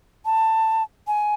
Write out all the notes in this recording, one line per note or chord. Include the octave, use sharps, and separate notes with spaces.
A5
G#5